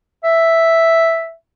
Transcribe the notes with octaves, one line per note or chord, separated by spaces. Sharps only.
E5